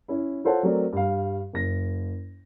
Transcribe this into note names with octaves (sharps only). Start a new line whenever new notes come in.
C#4 E4
F4 A4 C5 C#5 F#5 A5
F#3 A3 C4 A#4 D5
G2 F5
F#1 A#6